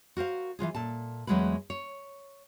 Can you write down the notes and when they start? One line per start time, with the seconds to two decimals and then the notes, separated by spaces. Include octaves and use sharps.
0.17 F#4 A#4 C5 F5
0.59 E3 F#3 F4 G#4
0.75 A#2 A4 A5
1.27 E2 F#3 G#3 A3 B4
1.70 C#5